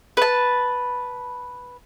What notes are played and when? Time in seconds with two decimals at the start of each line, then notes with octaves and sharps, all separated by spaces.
0.17 B4 A5